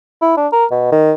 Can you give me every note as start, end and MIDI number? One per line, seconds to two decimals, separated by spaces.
0.22 0.35 64
0.37 0.47 62
0.53 0.65 70
0.71 0.89 47
0.92 1.13 51